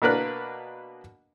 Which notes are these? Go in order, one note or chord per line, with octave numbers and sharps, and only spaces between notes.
B2 A#3 D4 A#4 B4 F#6